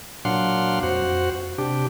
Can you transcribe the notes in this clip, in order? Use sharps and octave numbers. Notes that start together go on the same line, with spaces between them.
A#2 F#3 D4 F5 F#5 C6
F2 F#4 C5 F#5
C3 D4 G4